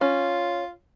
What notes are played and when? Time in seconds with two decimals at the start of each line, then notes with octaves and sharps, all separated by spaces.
0.01 C#4 F4